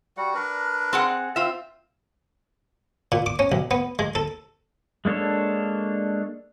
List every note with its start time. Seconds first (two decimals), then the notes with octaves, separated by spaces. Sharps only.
0.17 G3 F#4 F#5
0.34 D4 A#4 B4
0.93 C4 G#4 F#5
1.36 C4 F4 E5
3.12 A#2
3.26 D6
3.39 C#4
3.52 B1
3.71 B3
3.99 G#3
4.15 A4
5.05 G#3 A#3 D4 A4 C#5